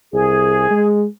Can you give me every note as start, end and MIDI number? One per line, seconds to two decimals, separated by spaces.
0.13 0.69 36
0.13 0.85 68
0.71 1.06 56